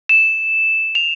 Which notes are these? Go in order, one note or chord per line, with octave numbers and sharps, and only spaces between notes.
E7
F7